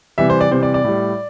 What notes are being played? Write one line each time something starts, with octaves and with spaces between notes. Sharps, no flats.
C3 E3 G3 E5
C5
D5
C3 E3 G3 C5
D5
D5
A2 G3